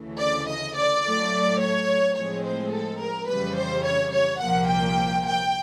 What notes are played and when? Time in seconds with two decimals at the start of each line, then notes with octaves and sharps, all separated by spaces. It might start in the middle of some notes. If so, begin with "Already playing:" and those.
Already playing: D2 C#3 E3 A3
0.19 D5
0.47 D#5
0.75 D5
1.03 A2 F#3 A3
1.60 C#5
2.15 A2 F3 G#3 C4 C#5
2.43 C5
2.73 A4
3.00 A#4
3.28 F2 C#3 E3 G3 B4
3.56 C5
3.85 C#5
4.12 C#5
4.40 C2 A#2 F3 A#3 F#5
4.68 G5
5.25 G5